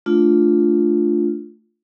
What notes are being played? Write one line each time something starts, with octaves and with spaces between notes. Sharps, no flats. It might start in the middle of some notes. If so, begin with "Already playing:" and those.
A3 D4 F4